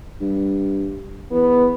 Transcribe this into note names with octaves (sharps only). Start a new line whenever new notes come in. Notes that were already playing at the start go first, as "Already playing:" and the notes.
G2
E2 B3